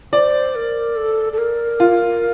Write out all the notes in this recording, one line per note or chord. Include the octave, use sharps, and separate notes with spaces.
C5 D5
A#4
A4
A4
A#4
F4